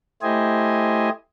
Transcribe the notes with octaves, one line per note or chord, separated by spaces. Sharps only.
A3 E4 G4 C5 D#5 G#5